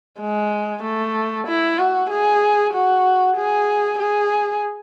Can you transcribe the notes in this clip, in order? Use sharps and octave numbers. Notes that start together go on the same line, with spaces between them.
G#3
A3
E4
F#4
G#4
F#4
G#4
G#4